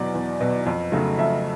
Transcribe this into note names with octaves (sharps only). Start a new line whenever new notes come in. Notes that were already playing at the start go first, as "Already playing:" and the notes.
Already playing: E2 B2 F#3 D5
E2
B2 F#3
F2
C#3 F#3 A3
F2 E5